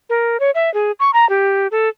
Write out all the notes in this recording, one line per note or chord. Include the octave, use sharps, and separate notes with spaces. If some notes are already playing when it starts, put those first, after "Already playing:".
A#4
C#5
E5
G#4
C#6
A#5
G4
A4